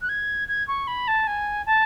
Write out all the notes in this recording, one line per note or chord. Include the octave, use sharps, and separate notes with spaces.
F#6
G#6
G#6
C#6
B5
A5
G#5
A5